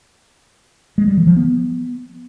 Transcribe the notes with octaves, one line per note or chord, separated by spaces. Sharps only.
G#3
G3
E3
F3
B3